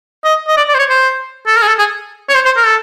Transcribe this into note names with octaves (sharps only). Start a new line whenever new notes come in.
D#5
D#5
D5
D5
C5
C#5
C5
A4
A#4
G#4
A4
G#4
C#5
C5
C5
A#4
A4